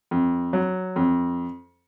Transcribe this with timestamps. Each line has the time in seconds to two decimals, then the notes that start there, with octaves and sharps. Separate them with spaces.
0.11 F2
0.53 F#3
0.96 F2